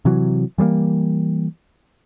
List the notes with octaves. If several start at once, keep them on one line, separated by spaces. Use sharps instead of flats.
C3 E3 F#3
E3 G3 G#3 A#3